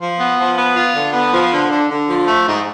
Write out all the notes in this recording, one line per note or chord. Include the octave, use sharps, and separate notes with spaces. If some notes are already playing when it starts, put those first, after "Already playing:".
F3
B3
F3
B3
F4
D3
B3
F3
D3
D3
D3
F3
A3
G#2